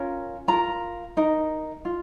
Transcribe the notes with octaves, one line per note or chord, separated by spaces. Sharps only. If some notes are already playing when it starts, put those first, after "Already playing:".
Already playing: C#4 F4 A#4
F4 A#4 A#5
D#4 A#4
F4